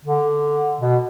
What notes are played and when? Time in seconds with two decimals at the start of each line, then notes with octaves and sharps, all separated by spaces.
0.05 D3
0.81 B2